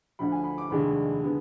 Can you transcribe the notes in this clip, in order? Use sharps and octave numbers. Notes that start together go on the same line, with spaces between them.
D2 D3 F3 B5
G#5
B5
D6
F1 D#2 D#3 G#3 D4 B5
D3 G#3 B3